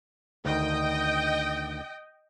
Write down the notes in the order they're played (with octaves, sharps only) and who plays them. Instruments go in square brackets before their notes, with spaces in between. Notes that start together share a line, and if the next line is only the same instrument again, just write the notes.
[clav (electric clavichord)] D2 D#3 [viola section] D#5 G5